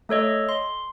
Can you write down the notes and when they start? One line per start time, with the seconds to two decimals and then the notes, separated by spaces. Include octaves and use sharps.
0.09 A3 A4 C#5 D#5
0.49 C6